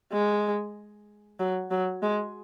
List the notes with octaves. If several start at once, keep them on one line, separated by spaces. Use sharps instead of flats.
G#3
F#3
F#3
G#3